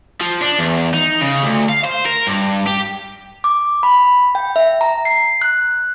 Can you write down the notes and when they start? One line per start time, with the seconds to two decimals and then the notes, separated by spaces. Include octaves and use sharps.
0.21 F3
0.41 D4
0.59 E2
0.94 D#4
1.21 C#3
1.43 D2
1.69 F5
1.85 C5
2.06 A#4
2.27 G2
2.67 G4
3.44 D6
3.83 B5
4.35 G5
4.56 E5
4.81 A#5
5.05 C7
5.42 F#6